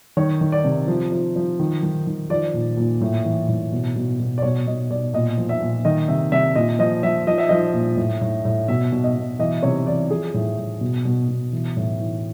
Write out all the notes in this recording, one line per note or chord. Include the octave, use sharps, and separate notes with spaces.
D#3 C#5
D#3
D5
C3
F3
F3
F3
D#3
D#3
D#3
F3 D5
A#2
A#2
A2
E3
A2
B2
B2
B2
D5
B2 C#5
B2 D#5
B2 D5
A#2 D#5
F3
E5
A#2
D#3 D#5
C3 E5
C3 E5
A#2 D#5
F3 D#5
F3 E5
F3 D#5
E5
F3 D#5
A#2
A2
A2
A2
B2 E5
B2
D#5
B2
E3 D#5
C3 C#5
E3 D5
F3 G#4
A2
A2
B2
B2
B2
E3
A2
E3